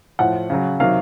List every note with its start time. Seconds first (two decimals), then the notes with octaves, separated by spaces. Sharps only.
0.19 A2 F3 F#5
0.50 C#3 F#3
0.80 C3 D#3 F#3 F5